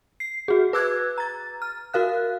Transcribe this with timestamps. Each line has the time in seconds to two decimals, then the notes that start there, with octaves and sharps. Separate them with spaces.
0.20 C7
0.48 F#4 G#4
0.73 B4 D6 E6 F#6 G#6
1.18 A#5 A6
1.62 F6
1.94 F#4 A#4 F5 F#6